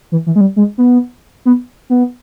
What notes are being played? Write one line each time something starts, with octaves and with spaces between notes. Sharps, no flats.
E3
E3
G#3
G3
G#3
B3
B3
B3